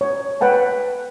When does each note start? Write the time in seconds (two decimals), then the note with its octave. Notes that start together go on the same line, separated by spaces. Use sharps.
0.01 C#5
0.41 B4 F#5 G5 A5